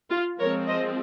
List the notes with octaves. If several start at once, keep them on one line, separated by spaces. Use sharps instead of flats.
F4
F3 G#3 C4 A#4 C#5
C5 D#5